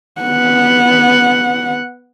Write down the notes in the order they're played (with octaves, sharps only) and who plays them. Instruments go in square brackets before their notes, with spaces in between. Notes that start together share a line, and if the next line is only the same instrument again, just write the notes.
[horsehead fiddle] B3 F#5